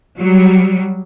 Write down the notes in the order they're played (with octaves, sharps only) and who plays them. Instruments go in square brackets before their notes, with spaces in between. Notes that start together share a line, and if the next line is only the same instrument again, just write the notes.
[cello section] F#3 G3